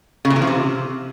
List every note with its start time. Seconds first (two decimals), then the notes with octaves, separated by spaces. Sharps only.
0.25 C#3
0.30 A#2
0.36 E3
0.42 F3
0.47 C3